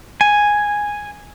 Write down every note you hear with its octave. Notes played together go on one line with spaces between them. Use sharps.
G#5